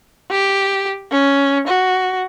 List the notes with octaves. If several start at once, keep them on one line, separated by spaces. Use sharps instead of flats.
G4
C#4
F#4